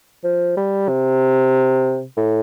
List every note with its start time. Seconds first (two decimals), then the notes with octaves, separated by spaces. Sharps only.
0.24 F3
0.57 G3
0.89 C3
2.18 A2